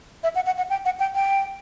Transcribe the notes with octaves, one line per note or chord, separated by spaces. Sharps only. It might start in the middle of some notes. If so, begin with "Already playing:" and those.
E5
F#5
F#5
F#5
G5
F#5
G5
G5